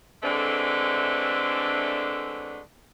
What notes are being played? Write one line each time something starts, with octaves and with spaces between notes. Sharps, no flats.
D3 E3 G#3 A3 C4 D4